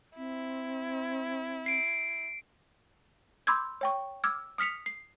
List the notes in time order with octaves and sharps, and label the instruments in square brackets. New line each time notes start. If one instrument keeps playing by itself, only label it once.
[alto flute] C4 [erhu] E4
[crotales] C7 D7
[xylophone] B5 C6 D6 E6 G6 G#6
C#5 G5 C#6
D6 E6 F6 G#6
D#6 F6 B6 C#7 F7
C7